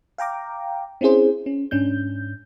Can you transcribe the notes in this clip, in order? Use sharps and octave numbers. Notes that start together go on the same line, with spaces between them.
F5 G5 A#5 D6
C4 C#4 E4 G#4 C5
C#4
G#2 C#4 D4 G6